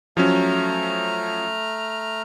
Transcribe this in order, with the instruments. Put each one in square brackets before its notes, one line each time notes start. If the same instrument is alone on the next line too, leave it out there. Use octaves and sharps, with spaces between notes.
[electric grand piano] F3 F#3 C#4 [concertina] A3 A#5 F6